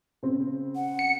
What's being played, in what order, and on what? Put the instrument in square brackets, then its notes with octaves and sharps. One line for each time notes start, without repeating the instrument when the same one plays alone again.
[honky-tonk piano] C#3 C4
[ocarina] F#5
[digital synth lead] C#7